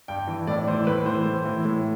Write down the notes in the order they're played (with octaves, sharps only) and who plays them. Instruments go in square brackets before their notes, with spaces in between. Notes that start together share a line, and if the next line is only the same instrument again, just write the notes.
[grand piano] G2 G5
E3
A2 D5
E3 C5
A2 B4
E3 C5
A2
E3
A2